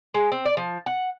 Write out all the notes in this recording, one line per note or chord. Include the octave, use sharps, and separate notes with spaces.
G#3
C4
D5
F3
F#5